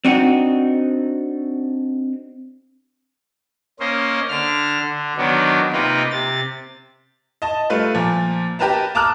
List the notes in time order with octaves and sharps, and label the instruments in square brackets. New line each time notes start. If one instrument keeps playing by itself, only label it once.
[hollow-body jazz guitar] C4 D4 D#4 F#4
[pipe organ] A#3 C#4 C5 D#5
D3 D4 F6
D3
D#3 F#3 B3 D4
C3 A#3 D#4 F4 B4
C3 A6
[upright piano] D#5 A5
G3 A3 F4 B4
A#2 F3
G4 A#4 B4 A5 A#5
A5 A#5 D6 D#6 F6 F#6